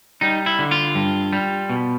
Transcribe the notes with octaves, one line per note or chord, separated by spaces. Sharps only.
G3 D#4
E4
D3
F4
G2
G3
B2